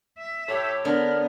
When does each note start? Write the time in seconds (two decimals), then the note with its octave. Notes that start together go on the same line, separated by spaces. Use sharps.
0.19 E5
0.49 A2 G4 A4 C#5
0.85 D3 B3 A#4